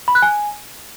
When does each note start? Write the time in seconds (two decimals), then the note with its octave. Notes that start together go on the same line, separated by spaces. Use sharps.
0.08 B5
0.15 F#6
0.22 G#5